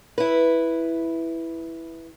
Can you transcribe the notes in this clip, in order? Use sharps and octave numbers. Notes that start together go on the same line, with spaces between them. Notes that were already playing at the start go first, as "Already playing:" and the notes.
E4 B4